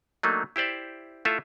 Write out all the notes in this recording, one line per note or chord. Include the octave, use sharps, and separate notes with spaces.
F#3 A3 A#3 D4 D#4
E4 G4 C5 D5 E5
A3 E4 F4 A4 E5